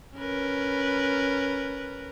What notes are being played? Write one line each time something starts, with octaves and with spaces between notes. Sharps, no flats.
C#4 A#4 B4